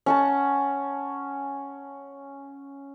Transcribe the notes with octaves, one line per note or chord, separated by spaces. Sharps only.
C#4 F#5 A5